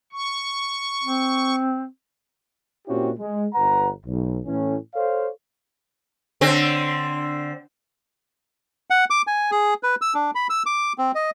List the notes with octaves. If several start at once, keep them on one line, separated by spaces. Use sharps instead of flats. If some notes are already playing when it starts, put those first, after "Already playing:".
C#6
C4
A#2 C4 C#4 E4 F#4 G4
G#3
G1 B4 F#5 A#5
B1
A2 E3 C#4
A4 C5 C#5 F5
D3 C4
F#5
D6
G#5
G#4
B4
E6
D4
B5
E6
D6
C4
D#5